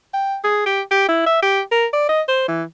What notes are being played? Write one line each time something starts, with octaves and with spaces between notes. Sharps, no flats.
G5
G#4
G4
G4
E4
E5
G4
A#4
D5
D#5
C5
E3